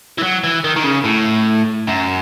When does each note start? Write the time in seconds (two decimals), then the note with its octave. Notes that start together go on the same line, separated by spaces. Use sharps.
0.18 E3
0.23 F#3
0.44 E3
0.64 D#3
0.76 D#3
0.84 C#3
1.05 A2
1.87 F#2